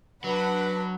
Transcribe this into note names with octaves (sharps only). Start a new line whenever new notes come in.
F#3 D4 B4 F#5 B5